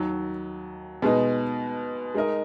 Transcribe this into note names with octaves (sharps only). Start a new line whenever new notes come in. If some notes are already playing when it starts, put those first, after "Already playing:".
Already playing: D#2 D#3 F#3
B2 G#3 B3 D#4
G#3 D#4 A#4 D#5